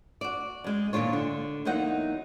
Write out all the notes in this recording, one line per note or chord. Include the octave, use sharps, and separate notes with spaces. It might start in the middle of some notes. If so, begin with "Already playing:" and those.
F#4 D5
F#2 G#3
A#2 D#3 D4 F4 C#5
D3
E2 F#3 A#3 D#4 F#5